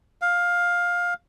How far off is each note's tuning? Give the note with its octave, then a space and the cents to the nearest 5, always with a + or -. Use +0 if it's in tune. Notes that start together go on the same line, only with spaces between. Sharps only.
F5 +15